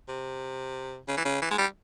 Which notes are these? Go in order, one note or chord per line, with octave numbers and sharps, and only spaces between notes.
C3
C#3
E3
C#3
E3
G#3
G3